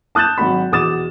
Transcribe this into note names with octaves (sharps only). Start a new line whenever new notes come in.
A5 D#6 F#6 G6 A6 E7
G#1 F#3 F#4 F#5 B5
E2 B2 D6 D#6 A6 E7